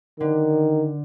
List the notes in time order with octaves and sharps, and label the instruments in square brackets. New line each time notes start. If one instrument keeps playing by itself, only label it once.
[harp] D3 [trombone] D#3